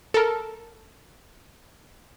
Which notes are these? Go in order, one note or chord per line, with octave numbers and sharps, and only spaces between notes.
A4 A#4